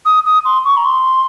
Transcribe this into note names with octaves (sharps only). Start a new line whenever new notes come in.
D#6
D#6
C6
C#6
A#5
C6